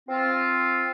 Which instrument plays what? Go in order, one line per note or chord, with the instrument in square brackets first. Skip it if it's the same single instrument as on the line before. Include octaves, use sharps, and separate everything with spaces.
[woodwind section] C4 F4